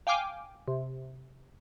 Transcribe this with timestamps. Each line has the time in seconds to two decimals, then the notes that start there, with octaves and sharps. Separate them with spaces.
0.07 F5 G5 G#5 D6 F6
0.68 C3